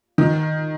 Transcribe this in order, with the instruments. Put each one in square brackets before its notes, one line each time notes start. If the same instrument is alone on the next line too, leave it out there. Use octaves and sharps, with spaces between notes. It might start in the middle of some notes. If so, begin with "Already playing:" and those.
[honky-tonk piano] D#3